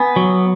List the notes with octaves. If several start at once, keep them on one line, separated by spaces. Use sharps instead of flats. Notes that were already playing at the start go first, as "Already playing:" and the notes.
Already playing: B3 F#5 G#5
F#3